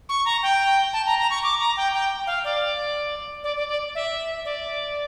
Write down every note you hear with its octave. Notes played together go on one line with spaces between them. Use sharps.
C#6
A#5
G5
A5
A#5
A#5
C#6
D6
A#5
G5
G5
F5
D5
D5
D5
D5
E5
D5